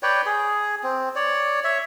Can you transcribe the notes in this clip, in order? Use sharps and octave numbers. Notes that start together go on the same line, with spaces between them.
B4 C#5 D5 G5
G#4
C4
C#5 D5
C#5 E5